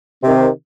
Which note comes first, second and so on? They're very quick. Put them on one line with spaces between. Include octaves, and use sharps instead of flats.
C3 C4 D#3